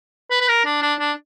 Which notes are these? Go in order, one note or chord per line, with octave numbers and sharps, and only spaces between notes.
B4
B4
A#4
D4
D4
D4